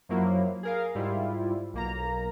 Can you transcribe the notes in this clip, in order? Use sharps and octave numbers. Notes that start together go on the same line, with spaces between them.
F#2 F3 F#3 A#3 E4
G#4 A#4 F5
G#2 G3 E4 F4
B1 A#3 A#5